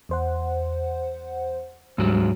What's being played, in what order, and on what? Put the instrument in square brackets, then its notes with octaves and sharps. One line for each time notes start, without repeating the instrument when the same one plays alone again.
[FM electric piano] E2 C5 F#5
[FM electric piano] D2 G3 [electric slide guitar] G#2 F#3